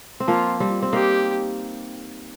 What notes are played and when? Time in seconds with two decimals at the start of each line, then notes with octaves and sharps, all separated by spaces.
0.20 C4
0.28 F3 A#3 F4
0.60 G3 C4
0.82 C4
0.93 A#3 D#4 G4